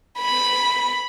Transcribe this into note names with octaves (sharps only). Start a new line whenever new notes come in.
B5